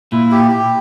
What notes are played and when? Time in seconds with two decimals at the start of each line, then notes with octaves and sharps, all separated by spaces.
0.12 A#2 E4
0.32 G4
0.51 G4